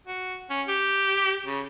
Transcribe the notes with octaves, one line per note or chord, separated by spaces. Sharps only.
F#4
C#4
G4
C#3